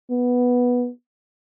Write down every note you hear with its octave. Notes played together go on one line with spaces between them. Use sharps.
B3